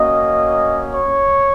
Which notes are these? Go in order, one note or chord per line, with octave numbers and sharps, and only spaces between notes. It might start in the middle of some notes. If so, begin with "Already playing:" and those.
Already playing: A#3 C#4 F#4 D#5
C#5